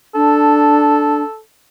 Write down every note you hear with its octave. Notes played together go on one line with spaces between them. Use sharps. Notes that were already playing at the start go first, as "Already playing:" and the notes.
D4 A4